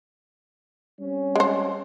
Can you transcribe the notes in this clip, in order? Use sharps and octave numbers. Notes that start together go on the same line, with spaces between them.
G3 C4 C#4
G#3 C5